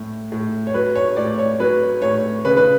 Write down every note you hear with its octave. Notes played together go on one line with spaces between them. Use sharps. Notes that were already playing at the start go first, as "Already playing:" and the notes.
Already playing: A2
A2
C#5
F#3 B4
C#5
A2 D5
C#5
F#3 B4
A2 C#5
C#3 B4
B4